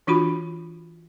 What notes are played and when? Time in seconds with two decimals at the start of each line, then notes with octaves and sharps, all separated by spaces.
0.07 E3 D4 F4 F#4 B5